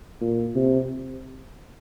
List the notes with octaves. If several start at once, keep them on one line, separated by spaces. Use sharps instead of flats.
A#2
C3